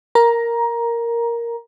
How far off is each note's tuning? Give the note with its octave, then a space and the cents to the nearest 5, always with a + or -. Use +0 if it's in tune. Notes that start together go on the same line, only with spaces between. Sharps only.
A#4 +0 A#5 +15